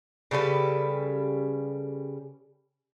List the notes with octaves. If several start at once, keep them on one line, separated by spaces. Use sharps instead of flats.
C#3 G3 A4 B4